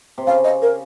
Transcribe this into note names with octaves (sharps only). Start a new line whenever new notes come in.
C3
C#3 F5
D#5
A#4